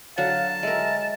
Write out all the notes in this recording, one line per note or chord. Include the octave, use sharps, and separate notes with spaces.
D3 F#3 F5 F#5 A5
G#3 A#4 E5